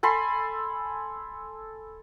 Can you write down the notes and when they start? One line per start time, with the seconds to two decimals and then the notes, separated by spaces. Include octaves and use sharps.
0.03 A4 G#5 B5 C6